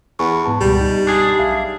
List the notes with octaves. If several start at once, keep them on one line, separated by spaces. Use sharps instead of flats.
E2 C#6
G#2 B3 A5
C#2 B2 G3
D#4
D4 G#4
B1 E5 F5